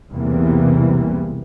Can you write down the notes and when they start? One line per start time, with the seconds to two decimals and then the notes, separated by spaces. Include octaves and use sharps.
0.13 B1 E2 C3 E3 G3 A#3